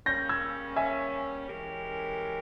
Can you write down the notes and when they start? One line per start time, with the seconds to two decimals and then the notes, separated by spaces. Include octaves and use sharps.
0.06 C#3 G3 A#3 C#4 G6 A#6
0.29 E6 G#6
0.76 E5 G#5
1.48 E3 G#3 C#4 G4 A#4